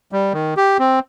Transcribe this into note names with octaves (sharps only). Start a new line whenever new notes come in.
G3
D#3
G4
C4